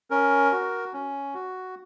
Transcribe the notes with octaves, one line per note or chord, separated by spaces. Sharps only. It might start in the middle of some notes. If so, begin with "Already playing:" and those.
C#4 A#4
F#4
C#4
F#4